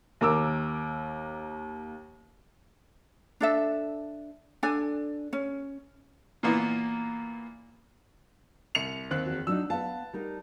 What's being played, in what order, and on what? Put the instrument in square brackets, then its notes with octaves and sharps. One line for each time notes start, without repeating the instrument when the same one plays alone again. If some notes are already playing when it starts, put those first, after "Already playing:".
[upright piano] D#2 A#4 D6 E6
[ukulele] D4 A4 E5
D4 A4 G#5
C#4
[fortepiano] A#2 E3 A#3 B3
[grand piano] C2 C#7 F7
D#2 C4 F#6
[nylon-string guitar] E2 F#4
[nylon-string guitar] F#3 D4 D#4 [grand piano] E6
[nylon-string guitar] B3 F5 [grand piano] A5
[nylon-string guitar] G3 D#4 A#4